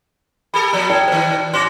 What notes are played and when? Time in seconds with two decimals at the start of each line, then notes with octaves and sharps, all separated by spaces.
0.54 G4 A4 A#4 B5
0.73 B2 F3 A#5
0.89 E4 A#4 D5 G5 A5 G#6
1.08 B2 D#3 C5
1.53 B3 C#4 F#4 C6 D6 A#6